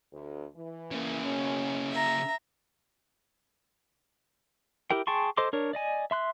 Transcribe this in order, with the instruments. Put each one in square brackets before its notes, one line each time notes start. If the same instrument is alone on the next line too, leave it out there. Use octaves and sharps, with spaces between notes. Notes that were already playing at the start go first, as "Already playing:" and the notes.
[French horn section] D2
E3
[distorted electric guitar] C#3 A#3
[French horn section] B2 C#4
[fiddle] E5 A#5
[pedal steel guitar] E4 G4 A#4 G5
G#4 G5 A5 C6 C#6
A4 C5 D#5 C6 D6
D4 A#4 C#5
D5 D#5 G#5
E5 C6 F#6